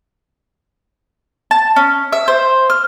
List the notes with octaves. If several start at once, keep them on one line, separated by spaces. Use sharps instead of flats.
A5
C#4
E5
C5
F6